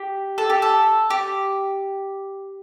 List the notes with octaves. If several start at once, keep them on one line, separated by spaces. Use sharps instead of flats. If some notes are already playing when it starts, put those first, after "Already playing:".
Already playing: G4
A4
G4
A4
G4